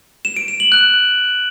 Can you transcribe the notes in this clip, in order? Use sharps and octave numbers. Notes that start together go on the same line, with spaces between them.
E7
D7
E7
F#7
F#6